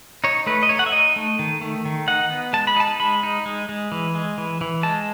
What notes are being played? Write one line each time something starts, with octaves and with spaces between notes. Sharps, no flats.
D#4 C#5
A3 B4
D#5
D#4 C#5
F#5
E5
D#4 D#5
A3
D#3
A3
D#3
D#4 F#5
B3
G#3 A5
B5
D#4 A5
G#3 B5
D#4
G#3
G#3
E3
G#3
E3
E3
G#3 A5